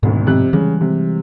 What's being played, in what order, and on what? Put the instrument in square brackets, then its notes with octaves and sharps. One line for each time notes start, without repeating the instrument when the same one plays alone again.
[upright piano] G#1 D2 [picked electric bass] G#2 B2
[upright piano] F2 C3 F#6
[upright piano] C#3 [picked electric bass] E3 G3 G#3
[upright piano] C3